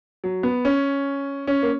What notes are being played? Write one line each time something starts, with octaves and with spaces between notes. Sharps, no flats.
F#3
B3
C#4
C#4
A#3